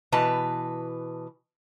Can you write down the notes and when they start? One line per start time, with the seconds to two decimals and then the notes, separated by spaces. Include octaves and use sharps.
0.12 B2 E3 B4 A5